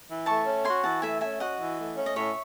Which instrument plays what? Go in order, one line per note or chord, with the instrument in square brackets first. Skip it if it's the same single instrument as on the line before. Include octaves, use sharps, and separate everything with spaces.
[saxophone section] E3
[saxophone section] A3 [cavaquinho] A5 C#6
[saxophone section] C#4
[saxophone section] F#4 [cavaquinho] G#5 C6
[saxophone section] E3 [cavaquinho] F#5 A5
[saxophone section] A3 [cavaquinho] E5 G#5
[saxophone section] C#4 [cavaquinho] E5 G#5
[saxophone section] F#4 [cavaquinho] D#5 F#5
[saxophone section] E3
A3
C#4
[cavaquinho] D#5
[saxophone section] A2 [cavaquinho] C#5 E5